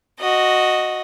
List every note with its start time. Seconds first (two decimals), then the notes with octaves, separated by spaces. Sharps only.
0.19 F#4 D#5